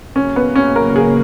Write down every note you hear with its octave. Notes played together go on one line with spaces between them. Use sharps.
C#3 F#3 A#3 C#4
B3
C#4
A#4
G#4